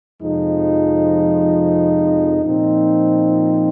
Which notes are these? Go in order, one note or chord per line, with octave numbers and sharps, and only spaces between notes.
F2 C3 F3 G#3 D#4
A#2 F3 C4 D#4